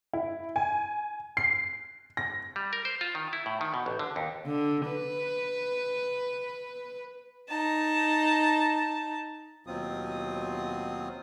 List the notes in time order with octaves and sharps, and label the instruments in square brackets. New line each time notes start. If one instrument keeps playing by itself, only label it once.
[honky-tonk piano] E4
G#5
C7
A#6
[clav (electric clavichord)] G3
A#4
C5
F4
D#3
E4
A2
D#3
B2
A1
D3
D#2
[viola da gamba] D3
B4
[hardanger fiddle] D#4 A5
[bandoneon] D#2 B2 F#3 C4 F4 D#6